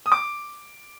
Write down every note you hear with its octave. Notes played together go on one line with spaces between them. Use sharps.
D#6
D6